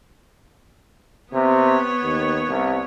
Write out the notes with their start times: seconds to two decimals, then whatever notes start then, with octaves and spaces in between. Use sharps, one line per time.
1.33 C3 B3 C#5
2.03 D#2
2.49 C2